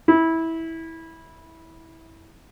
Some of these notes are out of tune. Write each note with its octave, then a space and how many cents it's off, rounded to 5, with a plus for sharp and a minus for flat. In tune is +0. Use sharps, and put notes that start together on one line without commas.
E4 -15